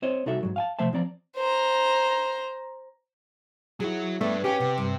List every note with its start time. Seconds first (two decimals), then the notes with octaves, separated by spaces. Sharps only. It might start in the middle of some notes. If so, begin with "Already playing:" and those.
0.02 C4 C5 C#5 D#5
0.26 C2 D#4 F#4 A4 E5
0.43 G#2 F#3
0.56 F5 G#5 A5
0.79 C3 F3 A3 C5 E5 A5
0.93 F3 C4 D5 A#5
1.37 C5 A#5
3.80 F#3 E4 F#4 G#4
4.21 G2 A3 B3 D4 D5
4.44 C#4 G4 B4 D#5 F5
4.60 C3 F#5
4.77 G2